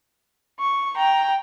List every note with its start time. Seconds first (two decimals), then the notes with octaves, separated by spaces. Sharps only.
0.60 C#6
0.97 G5 A#5